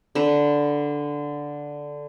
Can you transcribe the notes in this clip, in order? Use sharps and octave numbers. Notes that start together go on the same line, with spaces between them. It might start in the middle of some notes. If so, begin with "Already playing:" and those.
D3 B4